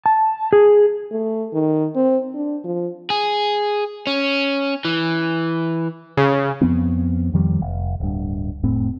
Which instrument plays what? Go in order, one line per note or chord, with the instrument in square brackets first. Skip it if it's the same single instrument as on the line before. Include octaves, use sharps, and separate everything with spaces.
[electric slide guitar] A5
G#4
[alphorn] A3
D#3
C4
D4
F3
[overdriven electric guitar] G#4
C#4
E3
[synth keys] C#3
[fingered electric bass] F2 F3 B3 C4
F2 D#3 F3 G3
F1
D1 G2
F1 A2 C4